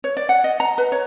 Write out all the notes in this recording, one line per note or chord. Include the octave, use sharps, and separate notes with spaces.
C#5
D5
F#5
D#5
A#5
B4
C#5